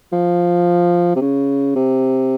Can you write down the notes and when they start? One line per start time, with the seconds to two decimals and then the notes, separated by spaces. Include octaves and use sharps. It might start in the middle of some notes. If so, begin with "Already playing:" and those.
0.13 F3
1.16 C3
1.21 C#3
1.76 C3